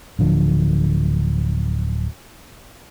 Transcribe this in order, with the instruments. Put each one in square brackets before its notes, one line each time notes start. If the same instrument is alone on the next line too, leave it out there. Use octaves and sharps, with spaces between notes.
[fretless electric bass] D1 D3 F3